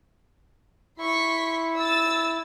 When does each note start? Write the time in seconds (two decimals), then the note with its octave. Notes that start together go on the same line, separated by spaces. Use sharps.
0.98 E4 C6 C#6 B6
1.77 E6 A6